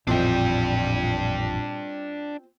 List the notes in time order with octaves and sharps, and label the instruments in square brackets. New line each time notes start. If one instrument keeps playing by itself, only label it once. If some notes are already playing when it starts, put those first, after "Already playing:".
[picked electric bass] A1 F2 [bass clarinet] A#2 [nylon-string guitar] C4 F4 D#5 [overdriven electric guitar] D4 G5